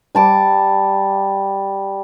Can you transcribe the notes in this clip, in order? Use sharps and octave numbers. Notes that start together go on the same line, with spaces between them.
G3 A5 D6